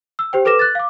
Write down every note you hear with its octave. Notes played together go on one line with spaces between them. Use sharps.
E6
G4 C5 G5
A4 B4 D6 A#6 E7
F#6 A6
F5 D6